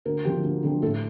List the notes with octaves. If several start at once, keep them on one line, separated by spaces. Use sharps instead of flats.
D2 A#4
D3 F3 C4 G4
D2
D3 F3 C4
A2 A4